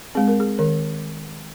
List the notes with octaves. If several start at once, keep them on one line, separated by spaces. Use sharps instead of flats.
G#3 C4 G#4
A#4
G#4
D#3 A#4